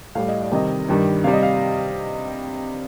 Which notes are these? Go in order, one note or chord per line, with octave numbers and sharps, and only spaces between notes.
A2 G3 F5
D#5
D5
C3 D#3 G3 D#5
G2 D#3 G3
C3 G3 F5
D#5
F5